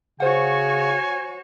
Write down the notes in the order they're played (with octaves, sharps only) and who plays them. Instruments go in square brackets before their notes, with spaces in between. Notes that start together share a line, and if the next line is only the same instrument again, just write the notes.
[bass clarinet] C#3 [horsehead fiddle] F#4 C#5 [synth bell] C5 F#5 [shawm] G#5